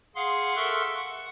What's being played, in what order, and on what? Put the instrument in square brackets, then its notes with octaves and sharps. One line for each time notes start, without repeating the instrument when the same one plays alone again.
[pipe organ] G#4 F5 F#5 C6
A4 A#4 E5 C6 C#6 F#6
F#5